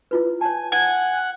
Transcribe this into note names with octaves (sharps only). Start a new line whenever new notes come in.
E4 F4 B4
C#5 G#5 A5
F#5 G#5